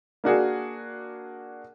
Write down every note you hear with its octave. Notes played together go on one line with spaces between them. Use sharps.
A#3 D4 F#4 G#4